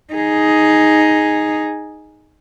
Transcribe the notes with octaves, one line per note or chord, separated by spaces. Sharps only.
D#4 G#4